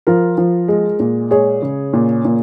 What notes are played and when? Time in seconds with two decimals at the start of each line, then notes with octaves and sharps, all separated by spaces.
0.07 F3 F4 A#4
0.38 F3
0.68 G#3
1.00 A#2
1.31 G#3 G#4 C#5
1.62 C#3
1.93 A#2
2.25 A#2